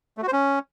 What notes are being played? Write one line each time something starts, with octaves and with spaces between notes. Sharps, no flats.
A3
F#4
C5
C#4